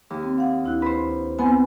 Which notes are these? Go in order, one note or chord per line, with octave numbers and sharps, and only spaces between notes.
D#2
C4
F5 F#5
D2 E4 F#6
B4 C5
B3 C4 G#5